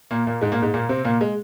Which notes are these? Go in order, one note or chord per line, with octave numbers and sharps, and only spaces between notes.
A#2 A#3
A#2 A#3
G#2 G#3
A#2 A#3
G#2 G#3
A#2 A#3
C3 C4
A#2 A#3
G#3